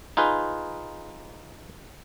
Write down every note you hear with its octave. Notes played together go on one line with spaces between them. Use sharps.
D#4 F4 G#4 B4